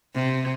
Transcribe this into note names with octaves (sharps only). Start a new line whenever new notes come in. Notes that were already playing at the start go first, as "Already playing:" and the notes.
C3